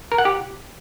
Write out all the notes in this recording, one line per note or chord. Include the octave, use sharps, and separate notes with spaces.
A#4
F#5
G4